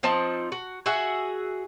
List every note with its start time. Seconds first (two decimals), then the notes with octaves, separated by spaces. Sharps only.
0.03 F3 C4 D#4 A5
0.52 F#4
0.86 F#4 G#4 E5 F#5